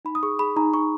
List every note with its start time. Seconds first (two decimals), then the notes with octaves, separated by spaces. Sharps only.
0.05 D#4 B5
0.15 D#6
0.23 G#4 C#6
0.39 G#4 B5
0.56 D#4 A#5
0.74 D#4 C#6